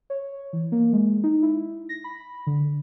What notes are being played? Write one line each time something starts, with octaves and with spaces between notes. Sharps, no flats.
C#5
E3
A#3
G#3
D#4
E4
A#6
B5
D3